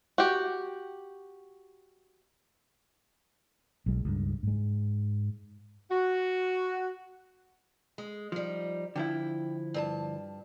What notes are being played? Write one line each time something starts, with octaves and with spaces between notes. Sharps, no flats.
F#4 G4
B1 G#3
C#2 G2
G#2 G#3
F#4
G#3
F3 G3 D#4
D3 F3 E4 G5
G2 A#4 A5